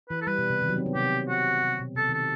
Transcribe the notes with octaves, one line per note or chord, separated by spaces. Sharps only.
E3 B4
A4
G3 B4
B2
C3
D#3
F#3
C4
B3
C3 G4
F#4
C3
B2
C3 A4
D#3 A4